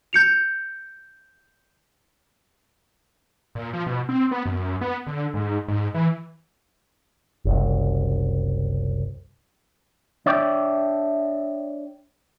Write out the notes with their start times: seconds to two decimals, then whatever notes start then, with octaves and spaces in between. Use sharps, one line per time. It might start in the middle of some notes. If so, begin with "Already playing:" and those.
0.13 G6 C#7 F7
3.55 A#2
3.73 F3
3.86 B2
4.09 C4
4.31 B3
4.46 F#2
4.81 B3
5.07 D3
5.34 G#2
5.68 G#2
5.94 E3
7.45 F#1 C2
10.26 D4 C#5 D5 E5 G5